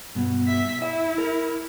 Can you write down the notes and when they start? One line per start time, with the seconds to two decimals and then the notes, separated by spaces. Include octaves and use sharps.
0.15 G2 B2
0.48 E5 B6
0.82 E4 E5
1.18 A#4